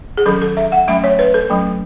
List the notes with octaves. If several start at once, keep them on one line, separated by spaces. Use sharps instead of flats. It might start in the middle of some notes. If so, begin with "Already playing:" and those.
G#4
D#3 F#3 C#4 A4
A4
E5
F#5
F#3 A3 C#4 E5
C#5
B4
A4
F#3 A3 C#4